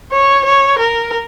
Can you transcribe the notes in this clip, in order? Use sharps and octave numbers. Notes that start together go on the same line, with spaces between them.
C#5
C#5
A#4